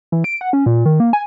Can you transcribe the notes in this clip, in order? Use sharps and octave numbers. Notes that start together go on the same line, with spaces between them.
E3
D7
F#5
C#4
A#2
D#3
A#3
G#5